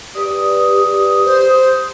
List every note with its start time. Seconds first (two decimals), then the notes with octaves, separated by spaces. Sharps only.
0.15 G4 B4 D5 D#6
1.25 C5